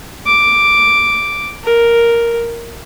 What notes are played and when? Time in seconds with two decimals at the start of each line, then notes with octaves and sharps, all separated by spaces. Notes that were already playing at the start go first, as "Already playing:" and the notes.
0.26 D6
1.64 A#4